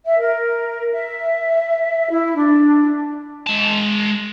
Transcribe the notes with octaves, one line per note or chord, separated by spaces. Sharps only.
E5
A#4
E5
E4
D4
G#3 A5